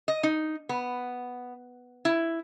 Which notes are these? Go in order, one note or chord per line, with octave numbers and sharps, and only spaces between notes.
D#5
D#4
B3
E4